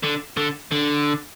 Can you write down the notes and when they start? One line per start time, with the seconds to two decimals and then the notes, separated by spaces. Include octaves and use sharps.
0.03 D3
0.37 D3
0.72 D3